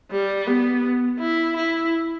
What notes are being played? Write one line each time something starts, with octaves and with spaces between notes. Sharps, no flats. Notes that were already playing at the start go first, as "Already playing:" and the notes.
G3
B3
E4
E4